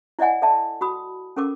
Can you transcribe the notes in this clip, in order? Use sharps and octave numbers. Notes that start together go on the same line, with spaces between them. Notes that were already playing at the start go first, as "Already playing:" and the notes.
E4 D5 D#5 F#5 G#5
A4 D5 E5 A5
F#4 B5 D#6
C#4 A4 A#4 D6